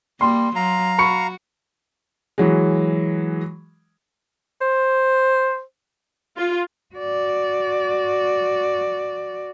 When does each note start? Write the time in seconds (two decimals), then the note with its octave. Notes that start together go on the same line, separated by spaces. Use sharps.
0.21 G3 A#3 C6
0.56 F#3 F5 A#5
0.99 F#4 B5 C#6 C#7
2.38 E3 F#3 G#3
4.61 C5
6.37 F4
6.95 F#4 D5